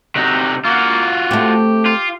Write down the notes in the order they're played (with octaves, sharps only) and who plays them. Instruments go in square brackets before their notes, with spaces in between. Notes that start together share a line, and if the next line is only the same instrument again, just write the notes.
[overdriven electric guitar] C3 D#4 [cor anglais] F#4
[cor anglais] A#3 [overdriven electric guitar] F4 F#4
[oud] A3 C4 [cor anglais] G4
[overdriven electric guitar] F4